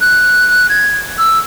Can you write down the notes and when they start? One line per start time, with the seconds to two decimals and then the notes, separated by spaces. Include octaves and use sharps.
0.01 F#6
0.69 G#6
1.19 E6